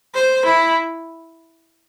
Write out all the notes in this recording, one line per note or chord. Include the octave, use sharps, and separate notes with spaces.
C5
E4